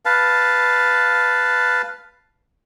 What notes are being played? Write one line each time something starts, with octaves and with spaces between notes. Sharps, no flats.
B4 F5 A5